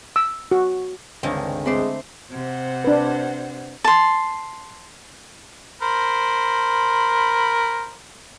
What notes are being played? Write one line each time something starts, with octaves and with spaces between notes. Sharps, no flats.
E6
F#4
C#2 G2 D3 D#3 G#3 C4
G#3 A3 C4 C5 D5 B5
C3 C5 F#5
D4 B4
A5 C6
A#4 C5 B5